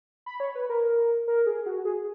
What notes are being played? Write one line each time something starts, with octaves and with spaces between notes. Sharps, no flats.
B5
C#5
B4
A#4
A#4
G#4
F#4
G#4